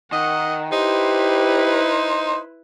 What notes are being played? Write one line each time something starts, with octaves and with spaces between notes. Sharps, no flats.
D#3 D#5 F#5
D#4 E4 G4 B4 C5